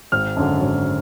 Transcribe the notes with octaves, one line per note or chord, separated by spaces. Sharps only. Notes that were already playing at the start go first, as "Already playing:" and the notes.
G#1 F6
F#2 D3
G#1